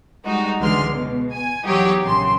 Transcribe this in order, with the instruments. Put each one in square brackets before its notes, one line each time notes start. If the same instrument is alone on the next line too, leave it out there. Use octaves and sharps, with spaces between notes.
[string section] G3 G#3 D#4 F#4
C#2 D3 E3 G#3 C6 F6
B2
G#5
E2 F#3 D#4 G4 C#5
A#1 C#3 C6